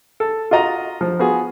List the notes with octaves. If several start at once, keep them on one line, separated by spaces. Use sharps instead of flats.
A4
F4 F#4 D#5 A#5
F3
B3 F4 F#4 G#4